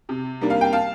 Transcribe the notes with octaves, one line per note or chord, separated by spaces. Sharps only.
C3
G3 A#3 D4
F5
G5
F5 A5